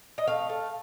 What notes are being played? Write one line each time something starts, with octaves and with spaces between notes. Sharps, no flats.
D#5
A3 F5
A3